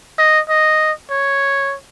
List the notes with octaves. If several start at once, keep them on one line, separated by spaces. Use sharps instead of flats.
D#5
D#5
C#5